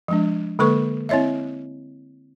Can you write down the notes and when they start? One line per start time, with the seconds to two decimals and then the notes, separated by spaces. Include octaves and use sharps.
0.08 F3 G#3 D4
0.59 D3 G#3 A#3 A4 B4 C#6
1.09 C4 E4 C#5 D#5 E5